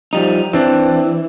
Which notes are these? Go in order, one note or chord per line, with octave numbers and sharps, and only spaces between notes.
F3 G3 D#4
E3 C4 D4 D5